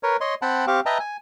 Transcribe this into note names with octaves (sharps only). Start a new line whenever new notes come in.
A#4 B4 C#5
C#5 D#5 C6
C4 F#5 G5 A5 B5
C4 G4 F5 C#6 D6
B4 D#5 E5 G5 A5 A#5
G#5